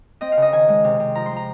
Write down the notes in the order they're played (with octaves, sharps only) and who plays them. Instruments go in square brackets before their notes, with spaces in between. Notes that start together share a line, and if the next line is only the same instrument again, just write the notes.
[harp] C4 D#5
F5
C#3
D#5
D#3 G#5
G#3
C3
C3
F3 A#5
C6
F3
A#5